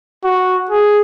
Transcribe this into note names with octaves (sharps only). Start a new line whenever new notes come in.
F#4
G#4